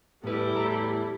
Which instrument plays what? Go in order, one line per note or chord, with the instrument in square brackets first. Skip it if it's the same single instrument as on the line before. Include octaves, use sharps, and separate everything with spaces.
[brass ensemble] E2 E3 A4 [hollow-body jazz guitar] A2 B4 [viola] G3 E4 [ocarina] G4
[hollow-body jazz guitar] A2 A5 A#5